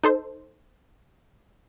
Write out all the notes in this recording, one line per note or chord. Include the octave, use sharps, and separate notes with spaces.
D#4 A4 C5